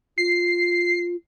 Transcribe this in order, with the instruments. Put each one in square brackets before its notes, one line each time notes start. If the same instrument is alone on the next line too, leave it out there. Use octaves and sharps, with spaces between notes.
[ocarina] F4 [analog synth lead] C7